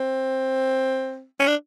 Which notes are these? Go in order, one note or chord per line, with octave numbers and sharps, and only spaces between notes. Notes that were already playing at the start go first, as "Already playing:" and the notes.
Already playing: C4
C#4
D4